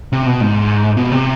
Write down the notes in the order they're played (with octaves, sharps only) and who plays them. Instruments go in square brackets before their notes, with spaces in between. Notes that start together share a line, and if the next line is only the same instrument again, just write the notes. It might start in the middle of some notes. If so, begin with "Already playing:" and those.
[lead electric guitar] C3
B2
G#2
B2
C3